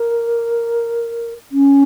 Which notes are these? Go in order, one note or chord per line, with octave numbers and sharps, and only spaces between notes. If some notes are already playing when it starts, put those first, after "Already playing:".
Already playing: A#4
C#4